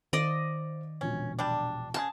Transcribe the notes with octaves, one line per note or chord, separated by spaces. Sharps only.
D#3 C5 D5 D#5 F5
E1 A#1 B2 C#4
G3 D4
C#3 F4 G#4 A5